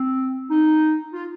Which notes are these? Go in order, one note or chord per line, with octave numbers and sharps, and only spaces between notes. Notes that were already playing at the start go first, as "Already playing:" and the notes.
Already playing: C4
D#4
F4